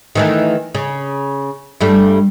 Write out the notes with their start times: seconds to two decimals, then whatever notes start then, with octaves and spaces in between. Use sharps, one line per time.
0.15 D#3 E3 A3
0.75 C#3
1.81 G2 G3 A3